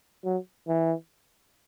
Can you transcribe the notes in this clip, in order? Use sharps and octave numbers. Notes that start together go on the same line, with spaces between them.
F#3
E3